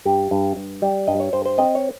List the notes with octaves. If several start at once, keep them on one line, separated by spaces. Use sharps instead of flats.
G2 G4
G2
G2
G3
G2 D#5
C#5
G2 C5
C5
C4 D#5
C#5